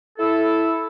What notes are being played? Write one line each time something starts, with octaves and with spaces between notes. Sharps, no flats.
E4 A4